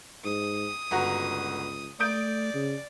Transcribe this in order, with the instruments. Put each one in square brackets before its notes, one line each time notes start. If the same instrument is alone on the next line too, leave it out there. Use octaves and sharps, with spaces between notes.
[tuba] G#2 [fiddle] D#6
[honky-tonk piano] G1 F#4 A#5 [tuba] C#2
[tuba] A3 [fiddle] D5 [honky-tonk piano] D#6 G6 D7
[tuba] C#3